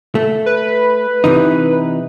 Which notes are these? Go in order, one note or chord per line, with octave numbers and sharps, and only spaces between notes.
A3
B4
C3 E3 D#4